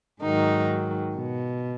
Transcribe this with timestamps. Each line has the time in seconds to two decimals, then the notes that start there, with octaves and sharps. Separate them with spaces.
0.21 G#2 D#3 F#3 D#4
1.15 B2